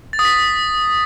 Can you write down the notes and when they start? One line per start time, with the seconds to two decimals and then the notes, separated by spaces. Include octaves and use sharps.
0.13 A6
0.19 D#6
0.25 B6